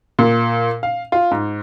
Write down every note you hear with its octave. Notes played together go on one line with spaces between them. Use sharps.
A#2
F5
F4
G#2